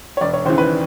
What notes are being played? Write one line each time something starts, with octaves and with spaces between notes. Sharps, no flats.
C#5
E1 D5
C#5
D#2 C#3 E3 C5
B4